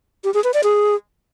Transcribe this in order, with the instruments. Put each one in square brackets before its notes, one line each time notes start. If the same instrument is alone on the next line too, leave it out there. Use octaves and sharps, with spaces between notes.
[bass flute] G4
G#4
B4
D5
G#4